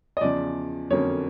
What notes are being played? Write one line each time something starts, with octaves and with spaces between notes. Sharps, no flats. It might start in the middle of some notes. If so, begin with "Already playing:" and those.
D#5
E2 C#3 F3 D5
F2 D3 F#3 A#3 C#4 C#5